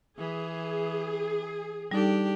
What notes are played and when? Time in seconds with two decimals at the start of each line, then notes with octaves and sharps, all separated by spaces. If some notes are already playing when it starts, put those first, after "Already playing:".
0.18 E3 G#4
1.91 G3 D4 D#4 G4 A4